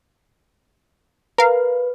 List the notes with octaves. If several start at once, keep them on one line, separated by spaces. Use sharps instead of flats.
A#4 B4 F5